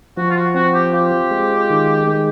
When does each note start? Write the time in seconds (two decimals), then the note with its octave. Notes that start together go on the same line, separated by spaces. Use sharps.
0.17 F3 F#4
0.30 F4
0.36 F#4
0.54 C4 F#4
0.74 G4
0.93 F4 G4
1.31 G#3
1.70 D#3
2.07 G#3